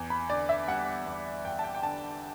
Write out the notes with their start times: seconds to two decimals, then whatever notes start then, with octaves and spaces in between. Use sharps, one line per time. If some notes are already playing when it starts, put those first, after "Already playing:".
Already playing: E2
0.10 B5
0.30 D3 D5
0.49 E5
0.68 G3 F#5
1.06 E2
1.45 E2 G5
1.59 A5
1.64 G5
1.75 G5
1.83 D3 A5